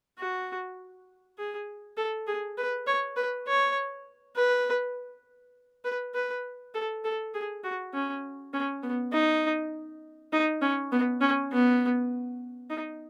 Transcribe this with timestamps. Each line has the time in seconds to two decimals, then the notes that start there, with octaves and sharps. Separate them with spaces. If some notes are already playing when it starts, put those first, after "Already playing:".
0.19 F#4
1.38 G#4
1.97 A4
2.27 G#4
2.58 B4
2.87 C#5
3.16 B4
3.47 C#5
4.36 B4
5.85 B4
6.15 B4
6.74 A4
7.04 A4
7.34 G#4
7.64 F#4
7.94 C#4
8.53 C#4
8.83 B3
9.13 D#4
10.33 D#4
10.62 C#4
10.92 B3
11.21 C#4
11.52 B3
12.70 D#4